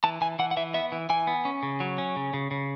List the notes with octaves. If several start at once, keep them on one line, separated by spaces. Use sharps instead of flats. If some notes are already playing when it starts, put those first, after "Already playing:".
E3 A5
E3 G#5
E3 F#5
F#5
E3 E5
B3 E5
E3
E3 G#5
B3
C#4
C#3
F#3
C#4
C#3
C#3
C#3